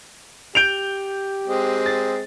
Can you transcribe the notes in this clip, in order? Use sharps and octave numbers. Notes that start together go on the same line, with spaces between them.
G4 G6 D7 F7
G#3 C4
A6